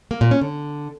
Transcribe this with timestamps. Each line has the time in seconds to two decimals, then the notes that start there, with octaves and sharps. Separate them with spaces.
0.11 A#3
0.21 A#2
0.31 C#4
0.41 D3